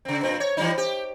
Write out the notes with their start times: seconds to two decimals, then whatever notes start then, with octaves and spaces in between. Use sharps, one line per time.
0.05 C#3 C4
0.23 G2 A#2 C4
0.40 C#5
0.57 E3 G3 D#4
0.78 G4